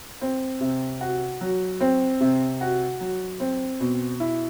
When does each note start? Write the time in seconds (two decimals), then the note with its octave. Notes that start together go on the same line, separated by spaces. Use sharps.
0.21 C4
0.60 C3
1.01 F#4
1.41 F#3
1.80 C4
2.20 C3
2.61 F#4
3.00 F#3
3.40 C4
3.80 B2
4.20 E4